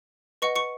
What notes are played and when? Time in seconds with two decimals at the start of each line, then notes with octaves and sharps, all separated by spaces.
0.42 B4 D#5 F#5 C#6 C#7
0.56 C#6 C#7